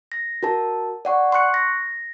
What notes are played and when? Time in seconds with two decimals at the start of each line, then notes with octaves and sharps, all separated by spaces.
0.12 A#6
0.43 F#4 A#4 A5
1.05 D5 F#5 C#6
1.32 C6 C#6 F#6 C#7
1.54 A#6